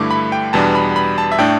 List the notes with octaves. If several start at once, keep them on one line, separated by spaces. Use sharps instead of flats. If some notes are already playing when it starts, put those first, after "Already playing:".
Already playing: G2 D3 A3 E4 D6
B5
G5
E2 B2 G3 B3 D4 A5
B5
B5
A5
E5
A2 A3 D4 G5